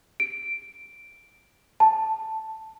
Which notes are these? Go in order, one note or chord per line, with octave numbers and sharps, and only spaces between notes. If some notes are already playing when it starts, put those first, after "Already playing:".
D7
A5